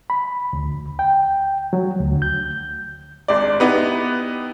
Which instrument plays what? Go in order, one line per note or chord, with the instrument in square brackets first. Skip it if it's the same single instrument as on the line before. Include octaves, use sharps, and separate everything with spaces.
[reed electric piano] B5
D2
G5
F#3
D2
G6
[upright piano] G#1 G#3 D4 D5
B3 D#4 E4 G4 B4